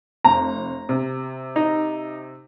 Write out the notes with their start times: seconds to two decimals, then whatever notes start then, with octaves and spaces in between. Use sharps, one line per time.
0.24 F1 A#5
0.89 C3
1.56 D#4